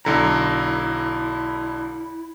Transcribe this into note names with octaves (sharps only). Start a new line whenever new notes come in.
B1 D3 E4 A#5